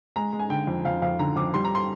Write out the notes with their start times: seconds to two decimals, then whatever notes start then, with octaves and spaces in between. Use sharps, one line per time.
0.16 G#3 A#5
0.33 G#3
0.39 G#5
0.50 D3 G5
0.67 F2
0.85 F2 F5
1.02 F2 F5
1.19 D3 A#5
1.36 F2 D6
1.54 G3 C6
1.65 A#5
1.75 C6